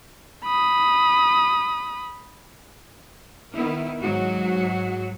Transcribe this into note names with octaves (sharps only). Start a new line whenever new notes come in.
B5 D#6
D#3 B3 E4
G#2 F#3 F#4